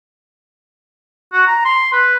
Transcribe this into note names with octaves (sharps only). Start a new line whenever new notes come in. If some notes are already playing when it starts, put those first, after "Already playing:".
F#4
A#5
C6
B4